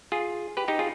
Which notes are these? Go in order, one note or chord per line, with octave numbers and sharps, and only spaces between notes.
F4 G#4
G4 B4
D#4 G4
F4 G#4